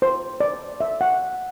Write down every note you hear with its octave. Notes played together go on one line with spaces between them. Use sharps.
C5
D5
E5
F#5